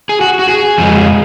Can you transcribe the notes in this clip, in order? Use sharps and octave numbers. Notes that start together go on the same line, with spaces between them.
G#4
F#4
F#4
G#4
F2 F3 G#3